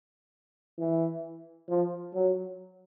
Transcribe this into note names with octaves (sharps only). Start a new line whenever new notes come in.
E3
F3
F#3